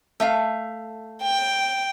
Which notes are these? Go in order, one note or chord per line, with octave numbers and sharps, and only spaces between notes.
A3 E5 F5
G5